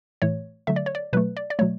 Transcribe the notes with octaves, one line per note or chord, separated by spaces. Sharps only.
A2 E3 A3 C#5
D3 F#3 A3 E5
D5
C#5
D5
B2 F#3 A3 B4
D5
D5
B2 F#3 A3 C#5